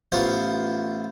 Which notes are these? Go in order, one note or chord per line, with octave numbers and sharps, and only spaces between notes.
A1 B3 F4 C5